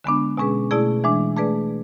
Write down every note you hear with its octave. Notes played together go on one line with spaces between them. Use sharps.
D3 G#3 B3 D4
B2 G#3 C#4 G#4 B4
B2 A3 E4 G#4 D5
E3 G#3 D4
A3 D4 G#4 B4 D5